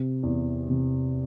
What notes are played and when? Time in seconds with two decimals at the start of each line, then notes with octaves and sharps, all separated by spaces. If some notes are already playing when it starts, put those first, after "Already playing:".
Already playing: C3
0.23 E2
0.69 C3